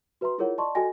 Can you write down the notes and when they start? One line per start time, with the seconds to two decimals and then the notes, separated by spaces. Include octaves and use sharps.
0.21 F#4 B4 E5 A#5 C6
0.38 E4 F4 G#4 A#4 C#5 F#5
0.58 D5 D#5 A5 C6 C#6
0.75 F#4 A4 D#5 G5 G#5 A#6